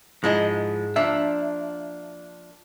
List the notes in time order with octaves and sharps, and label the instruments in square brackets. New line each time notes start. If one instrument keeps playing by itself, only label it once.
[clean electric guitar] G#2 G#3 [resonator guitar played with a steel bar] F3 E4 D#5
[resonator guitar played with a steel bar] F3 A#3 D4 [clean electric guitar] E5